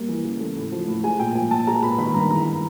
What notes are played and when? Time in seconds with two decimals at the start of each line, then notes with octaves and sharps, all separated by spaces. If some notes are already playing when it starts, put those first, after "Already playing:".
Already playing: G3 A#3
0.09 E3
0.24 C#3
0.40 A3
0.56 A2
0.72 F3
0.88 A2
1.04 G#3 G#5
1.19 A#2 G5
1.35 F3 G#5
1.51 A#2 A5
1.67 G#3 A#5
1.83 B3 B5
1.98 D#3 B5
2.14 G2 A#5
2.30 E3 A#5